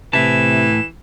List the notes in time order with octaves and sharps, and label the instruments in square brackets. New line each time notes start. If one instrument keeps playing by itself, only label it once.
[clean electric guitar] A2 E5 A5 [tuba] C3 [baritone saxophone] E3 [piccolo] E7